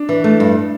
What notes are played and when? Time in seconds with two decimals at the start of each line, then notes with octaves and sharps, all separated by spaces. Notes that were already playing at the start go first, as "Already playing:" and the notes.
Already playing: D4
0.09 E3
0.24 A3
0.40 G2